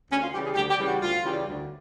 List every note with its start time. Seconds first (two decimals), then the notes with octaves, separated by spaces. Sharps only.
0.10 D2 C#4
0.21 F4
0.33 C#3 E3 G3 G4
0.44 G#4
0.55 D2 G4
0.70 G4
0.78 C#3 E3 G3
0.86 F#4
1.01 D2 F4
1.24 C#3 E3 G3
1.46 D2